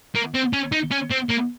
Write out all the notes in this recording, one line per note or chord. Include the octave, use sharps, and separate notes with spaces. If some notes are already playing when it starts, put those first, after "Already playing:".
A#3
C4
C#4
D#4
C#4
C4
A#3